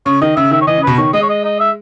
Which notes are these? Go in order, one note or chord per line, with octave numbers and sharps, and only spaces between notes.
C#3 C#5
D#3 D#5
C#3 E5
D#3 E5
C#5
E3 D#5
C#3
B2 B4
D#3 C#5
G#3 D#5
C#5
D#5
D#5
E5